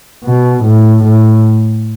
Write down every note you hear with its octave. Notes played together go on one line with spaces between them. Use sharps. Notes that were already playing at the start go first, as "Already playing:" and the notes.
B2
A2
A2